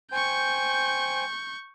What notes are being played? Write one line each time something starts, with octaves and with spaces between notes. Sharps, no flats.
C5 G5 G#5 C#6 G6